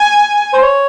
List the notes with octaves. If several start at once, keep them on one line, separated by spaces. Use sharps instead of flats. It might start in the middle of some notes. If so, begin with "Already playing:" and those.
Already playing: G#5
C5
C#5